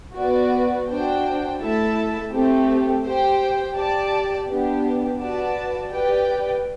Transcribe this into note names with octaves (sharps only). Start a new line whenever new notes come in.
B3 F#4 B4 D5
D4 F#4 C5 G5
A3 E4 A4 E5 A5
A3 C4 G4
G4 C5 G5
G4 D5 A5
B3 D4 G4
F#4 B4 D5 A5
G4 B4 D5 G5